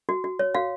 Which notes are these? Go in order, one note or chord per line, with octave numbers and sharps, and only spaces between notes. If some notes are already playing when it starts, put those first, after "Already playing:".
F#4
F#4
C#5
F#4 F5